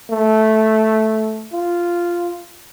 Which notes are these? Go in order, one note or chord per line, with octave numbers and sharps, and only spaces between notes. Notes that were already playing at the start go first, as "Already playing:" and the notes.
A3
F4